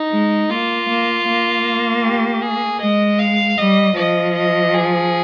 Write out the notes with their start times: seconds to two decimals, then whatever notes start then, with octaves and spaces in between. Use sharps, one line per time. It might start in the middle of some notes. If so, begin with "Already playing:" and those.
Already playing: D#4
0.12 G#3
0.50 A#3 F4
0.88 A#3
1.27 A#3
2.04 G4
2.43 G#4
2.81 G#3 D#5
3.19 F5
3.58 G3 D#5
3.96 F3 D#5
4.35 D#5
4.74 G#4